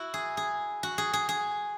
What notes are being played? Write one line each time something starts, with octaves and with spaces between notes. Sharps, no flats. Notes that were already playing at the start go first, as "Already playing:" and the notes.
Already playing: E4 F#4
G#4
G#4
F#4
G#4
G#4
G#4